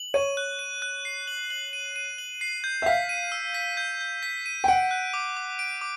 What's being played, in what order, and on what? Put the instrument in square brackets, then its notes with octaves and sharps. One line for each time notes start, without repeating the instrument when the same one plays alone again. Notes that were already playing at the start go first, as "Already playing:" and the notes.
Already playing: [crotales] F#7
[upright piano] C#5 [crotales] D#7
[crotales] F#6
D#7
F#6
C7
F#7
F#7
D#7
D#7
F#7
C7
G6
[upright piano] E5
[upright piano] F5 [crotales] B6
[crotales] D#7
E6
B6
G6
G6
B6
D#7
[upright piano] G5
[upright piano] F#5 [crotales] D7
[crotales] F#6
D6
D6
D7
D6